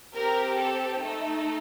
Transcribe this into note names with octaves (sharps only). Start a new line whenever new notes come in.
C4 G4 A#4
A4
A3 D#4 A4